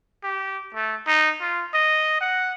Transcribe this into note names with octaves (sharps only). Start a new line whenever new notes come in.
G4
A3
D#4
F4
D#5
F#5